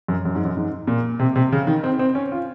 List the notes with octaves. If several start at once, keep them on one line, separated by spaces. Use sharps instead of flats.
F#2
F#2
G#2
F#2
G#2
A#2
C3
C3
C#3
D#3
C4
C4
C#4
F4